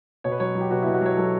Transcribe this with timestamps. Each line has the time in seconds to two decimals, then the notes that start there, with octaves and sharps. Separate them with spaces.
0.24 B2 C#5
0.32 B4
0.40 F#3 C#5
0.55 F#3
0.61 G4
0.71 B2 F#4
0.82 E4
0.86 B2
0.94 F#4
1.01 F#3 C#5
1.17 F#3 A4